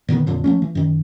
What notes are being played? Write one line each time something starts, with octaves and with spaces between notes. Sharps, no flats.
A#2 D3 D#3 B3
F2 A#2 D3 F#3
F3 A3 C#4
E3
F#2 D#3